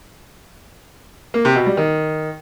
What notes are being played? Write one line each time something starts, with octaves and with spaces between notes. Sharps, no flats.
A#3
C3
B2
G3
D#3